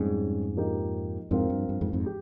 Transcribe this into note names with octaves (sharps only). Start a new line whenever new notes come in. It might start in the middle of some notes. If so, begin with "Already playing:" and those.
Already playing: F2 G#2 G3 C#4 G#4
F3 A#3 D#4 G4
F2 G#2 F3 C4 F4 A#4
G2
G2
F2 G#2
F2 G#2
G4